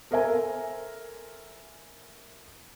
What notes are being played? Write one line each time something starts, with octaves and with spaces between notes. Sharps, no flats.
A4 A#4 C5 E5 G#5 A#5